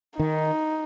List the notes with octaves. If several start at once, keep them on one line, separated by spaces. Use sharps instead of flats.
D#3 D#4